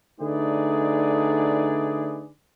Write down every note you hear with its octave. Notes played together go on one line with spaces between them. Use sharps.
D3 A3 D#4 G#4 B4 D5